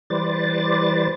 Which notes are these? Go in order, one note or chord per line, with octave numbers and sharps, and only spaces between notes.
E3 G3 B4 C5 D5 A6